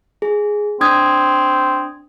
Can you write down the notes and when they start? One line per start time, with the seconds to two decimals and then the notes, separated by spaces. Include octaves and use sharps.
0.22 G#4
0.81 C4 D4 D#6 G#6